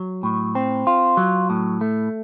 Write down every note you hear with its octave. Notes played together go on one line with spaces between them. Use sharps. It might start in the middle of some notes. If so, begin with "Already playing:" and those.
Already playing: F#3
A2
C4
F4
F#3
A2
A3